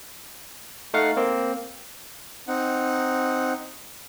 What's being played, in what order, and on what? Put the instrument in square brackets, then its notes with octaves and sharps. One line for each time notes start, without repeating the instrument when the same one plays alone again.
[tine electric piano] A3 D#4 F5 F#5
A#3 C4
[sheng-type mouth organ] C4 D#4 F#5